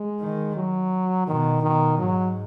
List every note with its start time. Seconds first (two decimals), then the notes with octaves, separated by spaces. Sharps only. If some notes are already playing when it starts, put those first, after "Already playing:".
Already playing: G#3
0.20 D#3
0.56 F#3
1.27 B2 D#3
1.63 B2 D#3
1.99 G#2 F#3